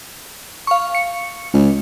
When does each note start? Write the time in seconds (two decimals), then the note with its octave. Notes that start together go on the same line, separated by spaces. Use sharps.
0.67 F5 C#6
0.95 C#7
1.54 C#2